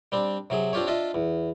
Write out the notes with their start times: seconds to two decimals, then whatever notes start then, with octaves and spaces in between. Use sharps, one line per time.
0.12 G3 C4 D4
0.50 C3 F#3 G#4
0.73 C4 D4 F4 G4 C#5
0.87 D4 F4 D#5 E5
1.14 E2